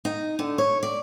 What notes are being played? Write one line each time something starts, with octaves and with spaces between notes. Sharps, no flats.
D#4
D3
C#5
D5